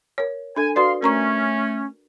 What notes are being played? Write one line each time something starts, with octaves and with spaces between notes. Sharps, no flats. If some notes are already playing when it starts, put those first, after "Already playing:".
A#4 C#5
D4 A4 G#5
F#4 B4 D5 F5 C6
A3 C#4 A#4 A#5 C#6